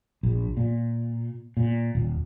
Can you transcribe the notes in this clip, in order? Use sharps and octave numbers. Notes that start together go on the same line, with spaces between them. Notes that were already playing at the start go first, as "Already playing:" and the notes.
A#1
A#2
A#2
D#1